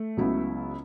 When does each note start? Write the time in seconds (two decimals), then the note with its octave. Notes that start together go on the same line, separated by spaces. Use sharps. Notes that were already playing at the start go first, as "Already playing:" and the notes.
Already playing: A3
0.17 C#2 C#3 F#3 B3 E4